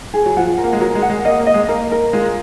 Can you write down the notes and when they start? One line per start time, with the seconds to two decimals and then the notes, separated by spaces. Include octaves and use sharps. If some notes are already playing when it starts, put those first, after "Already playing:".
0.13 G#4
0.26 F#3
0.37 F3 F#5
0.58 A#4
0.64 A#3
0.73 G#3
0.81 F#3 A#4
0.95 G#3
1.02 F#5
1.10 G#3
1.25 A#3 D#5
1.39 A#3
1.46 D#5
1.54 G#3
1.68 A#3 A#4
1.91 A#4
2.13 G#3 F4